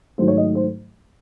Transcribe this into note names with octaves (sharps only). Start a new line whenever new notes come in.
G#2 D#3 F#3 A3 C5
C#5
D#5
C5